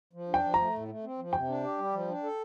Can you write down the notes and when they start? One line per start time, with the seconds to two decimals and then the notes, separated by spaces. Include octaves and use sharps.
0.13 F3
0.28 D4
0.34 G5
0.43 F3
0.54 A3 A#5
0.74 A2
0.88 A3
1.04 C4
1.18 F3
1.33 C3 G5
1.48 D4
1.64 G4
1.78 G3
1.93 F3
2.08 D4
2.23 A4